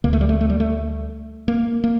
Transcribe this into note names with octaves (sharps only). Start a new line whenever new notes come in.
D2 D3 A#3
A3
G3
A3
A3
G3
A3
A#3
A#3